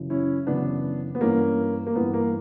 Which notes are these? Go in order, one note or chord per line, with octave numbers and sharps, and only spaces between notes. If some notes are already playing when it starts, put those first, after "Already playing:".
Already playing: F#2 C#3 E3
C#4 E4
F#2 C#3 E3 B3 D4
B3
G2 E3 A#3 C#4
A#3
G2 E3 B3
A#3